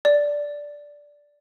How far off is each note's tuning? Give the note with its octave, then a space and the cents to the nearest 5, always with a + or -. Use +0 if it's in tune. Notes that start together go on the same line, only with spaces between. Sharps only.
D5 -10